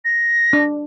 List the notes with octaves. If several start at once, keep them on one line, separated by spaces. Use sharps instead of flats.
A#6
D4